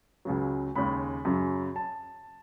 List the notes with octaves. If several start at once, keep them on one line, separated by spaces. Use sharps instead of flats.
C#2 C#3 F#3
D#2 C#3 G#3 B5
F#2 C#3 F#3
A5